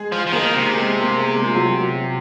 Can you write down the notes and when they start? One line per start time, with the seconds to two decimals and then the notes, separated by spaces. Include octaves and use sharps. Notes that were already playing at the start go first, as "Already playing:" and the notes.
Already playing: G#3 G#4
0.12 F3
0.27 F3
0.32 D#3 A#3 A#4
0.53 C3
0.73 G#3 G#4
1.01 A#3 A#4
1.28 G#3 G#4
1.46 F4
1.56 F#3 F#4